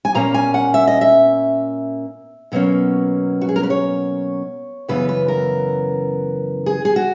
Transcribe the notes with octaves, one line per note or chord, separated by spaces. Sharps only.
G#5
A#2 A#3 C#4 A#5
G#5
F#5
E5
D#5
E5
B2 F#3 A#3 C#4
F#4
G#4
A#4
B4
C#5
F#2 C#3 E3 B3 B4
B4
A#4
G#4
G#4
F#4